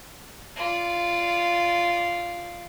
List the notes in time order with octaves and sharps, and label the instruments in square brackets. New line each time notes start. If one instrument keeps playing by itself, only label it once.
[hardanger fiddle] F4 D5